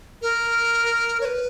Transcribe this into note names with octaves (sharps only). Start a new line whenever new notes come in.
A#4
C#5
B4